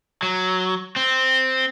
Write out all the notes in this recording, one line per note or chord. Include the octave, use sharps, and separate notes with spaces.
F#3
C4